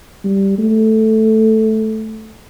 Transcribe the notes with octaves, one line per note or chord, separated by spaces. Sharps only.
G3
A3